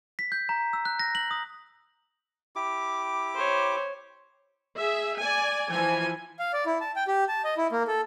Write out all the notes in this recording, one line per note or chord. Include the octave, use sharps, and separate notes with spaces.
B6
G6
A#5
E6
F#6
A#6
F#7
D#6
E4 G4 D6
C5 C#5
G#4 E5
D5 G#5
E3 F3 G#5
F5
D5
E4
A5
G5
G4
A5
D#5
E4
A#3
A4